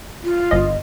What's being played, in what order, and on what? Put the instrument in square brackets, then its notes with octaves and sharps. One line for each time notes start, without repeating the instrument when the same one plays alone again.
[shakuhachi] F4
[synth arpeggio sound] G1 D#5